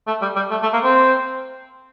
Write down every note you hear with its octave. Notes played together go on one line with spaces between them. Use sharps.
A3
G3
G3
A3
A3
A#3
C4